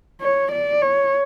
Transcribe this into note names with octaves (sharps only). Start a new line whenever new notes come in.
C#5
D5
C#5